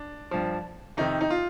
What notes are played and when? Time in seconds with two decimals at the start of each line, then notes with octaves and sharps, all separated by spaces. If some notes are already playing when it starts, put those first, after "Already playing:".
Already playing: D4
0.31 G2 F3
0.97 F2 C3 D#3 D#4
1.21 D#4
1.30 F4